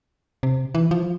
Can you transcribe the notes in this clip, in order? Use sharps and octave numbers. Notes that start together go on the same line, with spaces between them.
C3
E3
F3